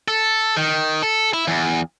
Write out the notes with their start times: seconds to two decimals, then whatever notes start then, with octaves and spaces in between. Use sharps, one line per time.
0.08 A4
0.57 D#3
1.02 A4
1.34 E4
1.48 E2